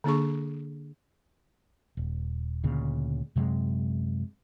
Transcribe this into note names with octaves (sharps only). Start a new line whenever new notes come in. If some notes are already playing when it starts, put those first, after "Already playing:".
D3 A#3 D4 G#4 C#6
D#1
D2 A#2 C#3
F#2 C3 F#3 G#3